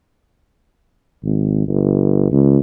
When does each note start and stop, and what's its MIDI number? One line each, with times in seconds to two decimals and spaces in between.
1.24 1.64 32
1.68 2.26 31
2.31 2.58 37